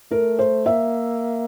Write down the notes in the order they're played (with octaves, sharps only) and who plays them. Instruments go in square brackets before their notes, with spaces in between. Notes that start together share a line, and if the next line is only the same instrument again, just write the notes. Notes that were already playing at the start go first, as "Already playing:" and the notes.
[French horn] A3 [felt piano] A#4
[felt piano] C5
[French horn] A#3 [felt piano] E5